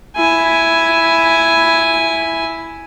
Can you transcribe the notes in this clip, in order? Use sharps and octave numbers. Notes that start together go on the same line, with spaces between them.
E4 G#5